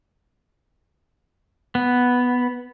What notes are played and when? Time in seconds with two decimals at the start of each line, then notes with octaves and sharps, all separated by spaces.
1.75 B3